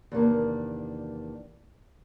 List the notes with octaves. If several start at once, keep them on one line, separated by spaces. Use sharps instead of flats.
E2 C3 D#3 A#3 D4